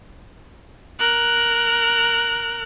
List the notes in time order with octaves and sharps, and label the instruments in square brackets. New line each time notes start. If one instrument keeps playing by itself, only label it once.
[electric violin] A#4 F#6